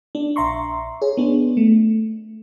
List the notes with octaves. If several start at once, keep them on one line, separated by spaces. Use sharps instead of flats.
D4
A#1 E5 A#5 C6 C#6
G#4 C#5
B3 D4
A3